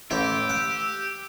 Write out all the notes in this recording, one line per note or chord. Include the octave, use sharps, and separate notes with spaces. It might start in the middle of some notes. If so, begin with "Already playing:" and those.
A1 E4 G4 E6
F#5